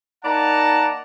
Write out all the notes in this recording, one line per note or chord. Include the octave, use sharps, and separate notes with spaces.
A#3 D#4 D5 F#5 A5 A#5